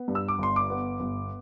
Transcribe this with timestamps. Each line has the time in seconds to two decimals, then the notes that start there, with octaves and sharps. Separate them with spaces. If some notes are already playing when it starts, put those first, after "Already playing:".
Already playing: B3
0.08 G2
0.15 E6
0.28 D6
0.39 G1 C6
0.56 D6
0.70 B3
1.00 G1